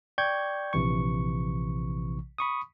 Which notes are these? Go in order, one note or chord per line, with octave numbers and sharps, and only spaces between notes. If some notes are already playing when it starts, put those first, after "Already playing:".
D5 G5 C#6 G6 G#6
A#1 C3 E3 C#6
B5 C#6 D#6